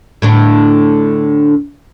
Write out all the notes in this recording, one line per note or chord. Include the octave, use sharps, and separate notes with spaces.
A2 D3 D4